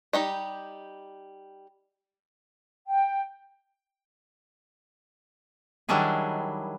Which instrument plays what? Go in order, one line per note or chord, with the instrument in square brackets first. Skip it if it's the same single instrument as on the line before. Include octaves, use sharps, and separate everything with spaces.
[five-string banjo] G3 D#4 G4 D#5
[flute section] G5
[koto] D#3 F#3 G3 D4 E4 G#4